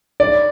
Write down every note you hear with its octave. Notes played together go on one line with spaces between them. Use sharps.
D5